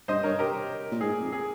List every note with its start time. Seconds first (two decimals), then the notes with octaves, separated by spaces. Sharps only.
0.08 G2 C5 D#5
0.23 G2 A#4 C#5
0.39 G4 A#4
0.92 A#2
1.01 G#2 G#4
1.12 A#2
1.22 F2
1.33 G#4